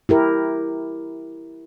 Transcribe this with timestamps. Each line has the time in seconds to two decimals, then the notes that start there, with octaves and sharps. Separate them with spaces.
0.09 E4 G4 A#4